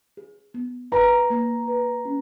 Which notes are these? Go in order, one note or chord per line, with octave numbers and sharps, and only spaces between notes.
G#4
B3
B4 A#5
A#3
B4
C#4